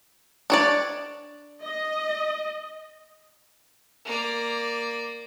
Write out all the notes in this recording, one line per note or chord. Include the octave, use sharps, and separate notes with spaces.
D4 C#5 D5
D#5
A#3 D5